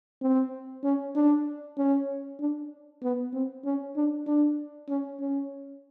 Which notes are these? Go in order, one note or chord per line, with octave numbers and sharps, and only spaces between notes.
C4
C#4
D4
C#4
D4
B3
C4
C#4
D4
D4
C#4
C#4